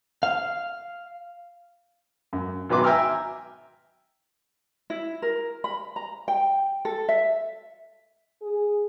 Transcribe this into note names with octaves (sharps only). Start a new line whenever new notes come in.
F5
F#2
G#1 B2 F#3 B4 C6 D6
E5 G5 G#5 A#5 E6 F6
E4
A#4
B5
A#5
G5
A4
E5
G#4